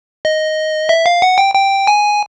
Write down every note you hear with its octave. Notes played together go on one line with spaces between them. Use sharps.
D#5
E5
F5
F#5
G5
G5
G#5